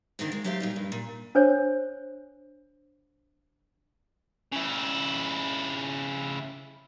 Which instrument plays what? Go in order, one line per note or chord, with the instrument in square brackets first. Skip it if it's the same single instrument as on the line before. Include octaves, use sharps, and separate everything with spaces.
[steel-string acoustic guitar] D3 D#3 A#3 C4
G#3
F#3 A3 G4 C5 F5
A#2 G3 D#4
G2
A#2
[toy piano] D4 C5 C#5
[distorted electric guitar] C#3 E4